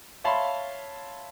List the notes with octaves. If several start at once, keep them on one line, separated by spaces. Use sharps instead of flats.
C#5 E5 F5 A5 B5 C6